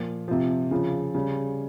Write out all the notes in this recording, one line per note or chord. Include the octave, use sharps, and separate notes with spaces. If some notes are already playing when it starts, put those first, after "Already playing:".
Already playing: A#2 F3
C3 F3
C#3 F3
C#3 G3